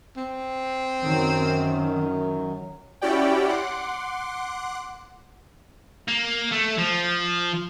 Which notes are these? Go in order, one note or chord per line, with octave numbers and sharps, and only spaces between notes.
C4
F#2 D#3 F#3
C#4 E4 F#4 G4 D5 G5
F#5 C6 D6
A#3
A3
F3